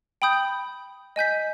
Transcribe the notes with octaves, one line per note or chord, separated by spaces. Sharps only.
G5 B5 D#6 G6
D#5 G#5 G6 B6